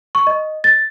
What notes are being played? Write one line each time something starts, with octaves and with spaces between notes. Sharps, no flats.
C#6
D#5
A6